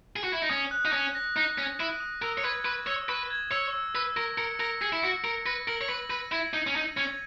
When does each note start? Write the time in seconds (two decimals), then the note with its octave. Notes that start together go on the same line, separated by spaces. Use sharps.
0.16 G#4
0.24 F#4
0.33 E4
0.42 D#4
0.49 C#4 D#6
0.71 F#6
0.85 D#4
0.93 C#4 D#6
1.15 A#6
1.36 D#4 A#6
1.58 C#4 A#6
1.80 E4 D#7
2.00 D#6
2.22 A#4 E6
2.38 C#5
2.44 B4 G#6
2.65 B4 C#6
2.87 C#5 E6
3.09 B4 C#6
3.30 G#6
3.51 C#5 E6
3.73 E6
3.95 B4 E6
4.16 A#4 A#6
4.38 A#4 C#7
4.60 A#4 A#6
4.82 G#4 C#7
4.93 E4
5.03 F#4 C#7
5.24 A#4 C#7
5.46 B4 A#6
5.68 A#4 F#7
5.81 C#5
5.89 B4 F#7
6.10 B4 D#7
6.32 E4 G#6
6.54 D#4 D#7
6.67 C#4
6.75 D#4 D#7
6.96 C#4 G#6